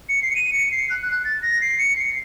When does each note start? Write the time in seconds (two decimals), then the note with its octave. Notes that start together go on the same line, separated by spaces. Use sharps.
0.09 C#7
0.22 C7
0.31 C#7
0.35 D#7
0.53 C#7
0.71 C7
0.90 F#6
1.07 F#6
1.24 A6
1.42 A#6
1.61 C7
1.79 C#7
1.96 C7